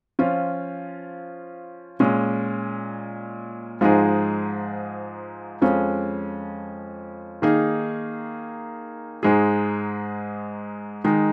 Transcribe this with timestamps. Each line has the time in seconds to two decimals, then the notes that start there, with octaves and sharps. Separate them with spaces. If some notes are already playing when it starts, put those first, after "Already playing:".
0.19 F3 C#4 F4
2.00 A#2 G#3 C#4
3.81 G#2 F3 G#3 D#4 G#4
5.62 F2 F3 G#3 C#4
7.42 D#3 A#3 D#4 G#4
9.23 G#2 G#3 D#4 G#4
11.04 D#3 G#3 D#4